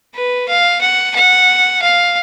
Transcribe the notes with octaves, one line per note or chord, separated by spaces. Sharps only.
B4
F5
F#5
F#5
F5